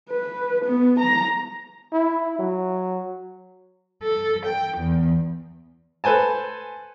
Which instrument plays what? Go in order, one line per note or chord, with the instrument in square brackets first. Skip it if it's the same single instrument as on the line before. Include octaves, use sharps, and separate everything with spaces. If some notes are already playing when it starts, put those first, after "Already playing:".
[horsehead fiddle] B4
B3
A#5
[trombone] E4
F#3
[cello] A4
G5
E2
[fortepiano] A4 B4 C5 G#5 A5